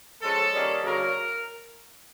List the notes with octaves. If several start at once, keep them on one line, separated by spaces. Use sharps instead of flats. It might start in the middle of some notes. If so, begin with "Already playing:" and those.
F3 G#3 C#4 A4
D#3 G3 A#3 C#4
C#3 F#3 A#3 D4 A#4